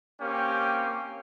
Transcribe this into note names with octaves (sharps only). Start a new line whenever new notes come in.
A#3 C4 C#4 G4 G5